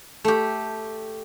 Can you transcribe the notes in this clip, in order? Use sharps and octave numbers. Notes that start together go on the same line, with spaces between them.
A3 G4